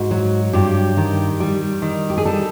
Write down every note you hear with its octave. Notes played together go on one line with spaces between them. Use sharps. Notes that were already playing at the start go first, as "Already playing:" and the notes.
Already playing: G#2 F#4
F#3
G2 G4
D#3
G3
D#3
G4
G#4
G3 A4